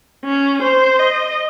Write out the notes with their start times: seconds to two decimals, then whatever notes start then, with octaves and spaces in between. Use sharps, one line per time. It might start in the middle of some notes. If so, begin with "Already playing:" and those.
0.25 C#4
0.63 C5
0.99 D#5